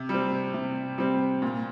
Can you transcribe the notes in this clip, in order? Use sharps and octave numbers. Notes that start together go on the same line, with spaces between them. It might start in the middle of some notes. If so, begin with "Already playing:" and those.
Already playing: C3
G3 C4
C3
G3 C4
A#2